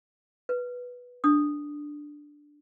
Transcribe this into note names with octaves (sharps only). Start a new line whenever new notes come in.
B4
D4 D#6